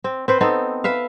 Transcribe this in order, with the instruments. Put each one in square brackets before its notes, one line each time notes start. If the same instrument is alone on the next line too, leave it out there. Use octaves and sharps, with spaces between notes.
[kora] C4
C4 B4 C5
B3 C4 D#4 A4
B4 E5 F5